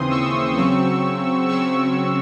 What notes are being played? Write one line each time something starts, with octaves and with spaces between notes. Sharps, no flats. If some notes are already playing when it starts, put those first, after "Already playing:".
Already playing: D#2 C#3 E3 C4 C6 D#6
C#6 E6
C#3 F#3 C4
C#3 F#3 C4 C#6 E6